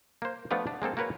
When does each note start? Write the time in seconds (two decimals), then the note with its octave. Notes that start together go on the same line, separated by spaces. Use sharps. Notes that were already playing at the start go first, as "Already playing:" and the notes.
0.22 A#3 C5
0.51 F3 A3 B3 D4 F4 D5
0.67 D4
0.82 G#3 A#3 C4 A4
0.97 A#3 F#4 A#4 B4 C#5